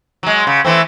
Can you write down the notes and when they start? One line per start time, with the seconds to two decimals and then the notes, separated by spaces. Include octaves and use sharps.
0.23 F#3 G#3
0.47 C#3
0.65 E3 A3 C4